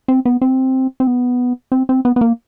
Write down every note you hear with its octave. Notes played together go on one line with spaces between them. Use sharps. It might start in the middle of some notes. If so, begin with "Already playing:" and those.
C4
B3
C4
C4
B3
C4
C4
B3
B3
A#3